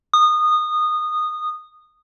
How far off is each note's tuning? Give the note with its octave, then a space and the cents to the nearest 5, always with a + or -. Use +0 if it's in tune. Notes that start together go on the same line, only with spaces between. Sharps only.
D#6 -20